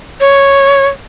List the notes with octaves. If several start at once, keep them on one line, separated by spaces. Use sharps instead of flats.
C#5